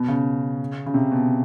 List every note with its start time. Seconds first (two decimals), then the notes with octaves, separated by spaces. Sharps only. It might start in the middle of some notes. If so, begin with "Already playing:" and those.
Already playing: B2
0.08 C#3
0.86 C#3
0.94 C3
1.12 B2